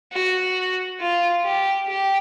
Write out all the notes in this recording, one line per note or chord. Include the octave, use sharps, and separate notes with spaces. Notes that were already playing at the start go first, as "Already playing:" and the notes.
F#4
F4
G4
G4